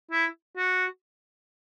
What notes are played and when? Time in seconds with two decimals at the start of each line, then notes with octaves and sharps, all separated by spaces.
0.11 E4
0.57 F#4